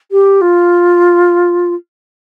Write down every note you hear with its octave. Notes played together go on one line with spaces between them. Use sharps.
G4
F4